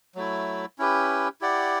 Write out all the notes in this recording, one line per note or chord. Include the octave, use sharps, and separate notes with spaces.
F#3 A3 E4
C#4 E4 G4 B4
E4 G4 D5 F#5